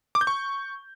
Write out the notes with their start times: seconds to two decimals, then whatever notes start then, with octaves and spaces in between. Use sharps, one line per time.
0.15 D6
0.21 G6
0.27 C#6